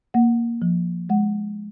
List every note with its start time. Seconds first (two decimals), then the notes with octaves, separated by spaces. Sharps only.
0.14 A#3 F#5
0.62 F3
1.09 G#3 F#5